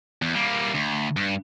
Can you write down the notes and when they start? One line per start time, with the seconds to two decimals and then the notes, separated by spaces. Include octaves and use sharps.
0.22 E2
0.35 G3 A#3
0.74 D2
1.17 G2